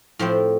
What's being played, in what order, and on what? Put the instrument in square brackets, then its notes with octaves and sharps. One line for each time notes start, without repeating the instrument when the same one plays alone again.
[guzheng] A2 F3 C4